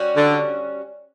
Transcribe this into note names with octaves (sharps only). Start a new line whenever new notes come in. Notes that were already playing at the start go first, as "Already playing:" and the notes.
Already playing: G3 C#4 F#4
D3